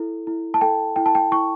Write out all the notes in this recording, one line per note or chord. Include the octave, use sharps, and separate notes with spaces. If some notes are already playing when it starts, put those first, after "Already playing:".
Already playing: E4 A4
E4
A5
A4 G5
E4 G5
A5
G5
E4 C#6